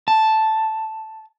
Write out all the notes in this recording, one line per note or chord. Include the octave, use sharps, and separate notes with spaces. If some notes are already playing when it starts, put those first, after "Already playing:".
A5